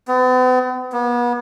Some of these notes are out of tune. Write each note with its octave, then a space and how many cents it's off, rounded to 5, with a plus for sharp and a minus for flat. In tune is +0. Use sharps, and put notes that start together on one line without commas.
B3 +45
B3 -35